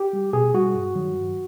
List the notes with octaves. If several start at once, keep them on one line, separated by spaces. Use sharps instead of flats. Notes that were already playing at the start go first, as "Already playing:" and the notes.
Already playing: G4
G3
B2 G#4
G3 F#4
G2
D#3 F#3
G2